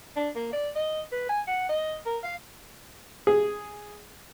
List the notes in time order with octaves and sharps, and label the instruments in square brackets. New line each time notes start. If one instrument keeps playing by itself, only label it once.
[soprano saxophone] D4
A#3
D5
D#5
B4
G#5
F#5
D#5
A#4
F5
[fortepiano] G#4